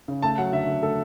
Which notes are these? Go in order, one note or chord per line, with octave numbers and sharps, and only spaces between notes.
C#3
A3 A5
F#3 F#5
D3 E5
D3
A3 A4